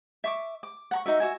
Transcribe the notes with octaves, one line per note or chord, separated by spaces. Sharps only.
E5 C#6 D6
D6
F#5 A#5 C#6
D#4 F#4 E5
F#4 E5 G#5